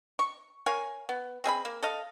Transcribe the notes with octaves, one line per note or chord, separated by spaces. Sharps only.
C#6
A#4 C#5 F5 G#5
B3
C4 G#4 E5 B5
A#3
A4 D#5 F5